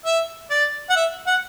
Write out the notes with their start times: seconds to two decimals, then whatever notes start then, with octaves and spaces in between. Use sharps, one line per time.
0.05 E5
0.50 D5
0.90 F#5
0.96 E5
1.26 F#5